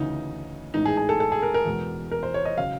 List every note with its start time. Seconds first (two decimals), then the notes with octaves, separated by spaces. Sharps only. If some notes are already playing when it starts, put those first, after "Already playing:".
Already playing: D2 C#3 E3 D#4
0.74 A1 G#2 E3 D#4
0.86 G#4
0.97 G#4
1.09 A4
1.20 A4
1.32 G#4
1.42 A#4
1.54 A#4
1.65 E2 B2 G#3
2.11 A#4
2.23 C5
2.34 C#5
2.45 D#5
2.57 C#3 F#3 F5